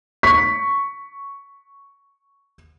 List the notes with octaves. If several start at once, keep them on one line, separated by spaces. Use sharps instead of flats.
C#6 B6